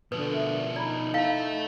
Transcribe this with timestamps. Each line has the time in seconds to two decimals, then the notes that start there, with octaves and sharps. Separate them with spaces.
0.12 B2 D3 F3 B4 D#6
0.31 A#4 E5
0.76 D#4 D5 A#5 B5
1.14 E4 A4 E5 F5